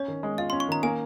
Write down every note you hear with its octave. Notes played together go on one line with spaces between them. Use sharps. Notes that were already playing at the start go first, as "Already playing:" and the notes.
Already playing: C#4 C#5
D#3
G#3
F4 D#5
C#4 C6
C#6
D#3 A#5
A#3 G#5